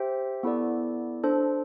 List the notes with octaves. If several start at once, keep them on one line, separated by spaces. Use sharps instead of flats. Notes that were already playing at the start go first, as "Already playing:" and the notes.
Already playing: G4 C5 E5 G5
B3 E4 A4 D5
D4 A4 C5